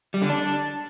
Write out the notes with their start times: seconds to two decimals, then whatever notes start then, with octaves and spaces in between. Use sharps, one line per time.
0.14 G3
0.22 D3
0.29 D4